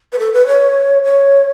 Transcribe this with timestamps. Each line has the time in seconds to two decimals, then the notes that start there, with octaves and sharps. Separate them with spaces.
0.13 B4
0.19 A4
0.33 B4
0.47 C#5
1.05 C#5